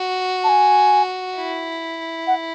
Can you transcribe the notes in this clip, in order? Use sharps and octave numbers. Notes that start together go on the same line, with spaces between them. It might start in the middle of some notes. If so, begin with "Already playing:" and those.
Already playing: F#4
A5
G#5
E4
F#5